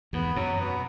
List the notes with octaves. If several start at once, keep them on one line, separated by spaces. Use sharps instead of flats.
E2 G#2 B3
F#2 B2 F#3
B3